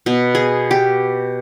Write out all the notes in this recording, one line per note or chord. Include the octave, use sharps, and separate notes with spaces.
B2
G#4
G4